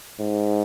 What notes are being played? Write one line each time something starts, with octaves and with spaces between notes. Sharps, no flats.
G#2